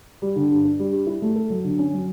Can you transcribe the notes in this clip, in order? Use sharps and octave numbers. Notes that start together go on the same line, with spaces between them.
G3
D3
G2
D4
G3
G4
E4
A3
A4
F#3
D3
C#4
F#3